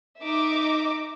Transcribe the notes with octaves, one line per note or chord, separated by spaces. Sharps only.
D#4 E5 D6